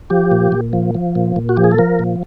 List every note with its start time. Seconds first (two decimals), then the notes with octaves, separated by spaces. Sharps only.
0.10 F3 G4
0.31 A#2
0.52 A#2
0.73 F3
0.95 F3
1.15 A#2
1.36 A#2
1.49 F#4
1.57 F3 G4
1.64 G#4
1.71 A4
1.78 F3 A#4
1.99 A#2